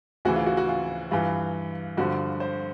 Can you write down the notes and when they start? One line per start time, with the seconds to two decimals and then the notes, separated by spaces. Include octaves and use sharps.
0.25 D2 C#3 E3 F#4
0.36 F4
0.46 F#4
0.57 F#4
0.68 F4
1.11 G2 E3 F4
1.97 G2 D3 F3 F#4
2.40 C5